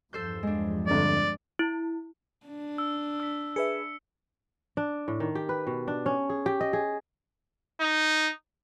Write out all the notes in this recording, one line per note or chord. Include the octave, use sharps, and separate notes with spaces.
E2 G2 F3 A4 C5 G6
G#3 D4
G1 F2 D5
E4
D4
E6
E6 B6
G#4 B4 E5 C#7
D4
A2
D#3
G4
B4
B2
D4
C#4
G#4
G4
D#5
G#4
D#4